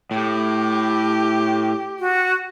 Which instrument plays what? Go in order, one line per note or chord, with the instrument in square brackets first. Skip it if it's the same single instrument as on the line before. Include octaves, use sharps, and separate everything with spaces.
[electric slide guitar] A2 [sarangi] G4
[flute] F#4